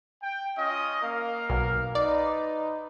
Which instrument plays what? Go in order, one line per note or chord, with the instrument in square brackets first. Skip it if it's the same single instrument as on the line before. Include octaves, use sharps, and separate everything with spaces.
[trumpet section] G5
C#4 F4 D#5
A#3 A#4 F5
[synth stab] B1
[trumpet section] D#4 B4 [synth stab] D5